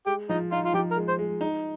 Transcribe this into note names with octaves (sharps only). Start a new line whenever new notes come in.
G#3 G4
F3 D#4
D#4 F4
F4
F3 G4
A#4
G#3
C5
G#3
D#4